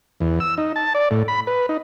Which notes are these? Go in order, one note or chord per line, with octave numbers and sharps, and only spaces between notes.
E2
E6
D#4
A5
D5
A2
B5
B4
D#4